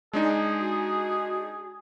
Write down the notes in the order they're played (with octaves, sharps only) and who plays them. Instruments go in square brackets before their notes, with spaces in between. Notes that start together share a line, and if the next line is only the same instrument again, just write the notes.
[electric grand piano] G#3 D4 D#4 [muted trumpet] G#4
[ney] F#4